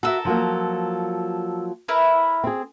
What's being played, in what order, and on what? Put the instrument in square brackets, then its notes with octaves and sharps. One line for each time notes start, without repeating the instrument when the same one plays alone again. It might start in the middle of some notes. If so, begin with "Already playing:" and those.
[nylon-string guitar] F#4 E5 [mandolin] A4 A#4 E6
[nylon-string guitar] F3 F#3 A#3
[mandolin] E4 A#4 B4
[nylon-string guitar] C4 G#4